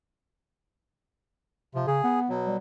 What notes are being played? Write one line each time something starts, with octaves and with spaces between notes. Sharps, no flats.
C3 F3
C#3 G#4
B3
B2 F#3
G3